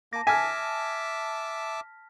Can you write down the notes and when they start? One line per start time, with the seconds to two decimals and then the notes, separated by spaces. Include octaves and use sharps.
0.13 A#3 A5 D6 A#6
0.27 E5 G#5 A5 D6 F6 B6